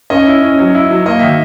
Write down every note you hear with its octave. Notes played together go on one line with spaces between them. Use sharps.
C#4 D#5
E4
C#4
F#3
E4
F#3
A#3 D#5
D#3 E5